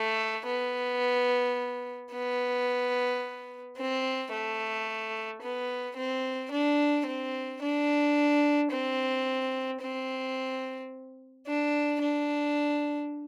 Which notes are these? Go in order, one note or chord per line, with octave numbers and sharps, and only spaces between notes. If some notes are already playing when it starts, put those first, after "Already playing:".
Already playing: A3
B3
B3
C4
A3
B3
C4
D4
C4
D4
C4
C4
D4
D4